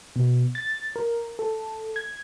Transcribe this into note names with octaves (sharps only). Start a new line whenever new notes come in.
B2
A6
A#4
A4
G#6